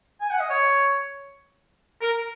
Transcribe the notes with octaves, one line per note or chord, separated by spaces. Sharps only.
G#5
F#5
D#5
C#5
A#4